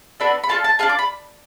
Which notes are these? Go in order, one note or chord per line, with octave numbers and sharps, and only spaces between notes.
B3 D4 F#4 A4 B5
B5
D4 F4 A4 A5
A5
D4 F4 G#4 A5
D6
B5